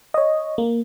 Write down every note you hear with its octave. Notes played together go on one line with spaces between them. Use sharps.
C#5 D#5
A#3